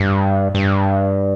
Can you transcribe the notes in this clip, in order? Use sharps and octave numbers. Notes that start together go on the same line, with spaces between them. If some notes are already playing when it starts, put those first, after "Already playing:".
Already playing: G2
G2